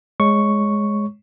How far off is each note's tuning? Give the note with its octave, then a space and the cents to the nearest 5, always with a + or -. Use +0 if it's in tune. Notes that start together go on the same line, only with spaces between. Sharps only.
G#3 +0 C#5 +0 C#6 +0